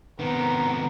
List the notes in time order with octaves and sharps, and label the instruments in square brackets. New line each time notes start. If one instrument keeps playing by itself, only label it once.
[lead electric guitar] C3 D#3 [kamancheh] B3 A#5